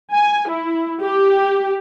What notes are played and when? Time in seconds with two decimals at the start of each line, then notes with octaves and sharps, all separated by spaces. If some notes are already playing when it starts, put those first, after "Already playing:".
0.13 G#5
0.49 E4
1.02 G4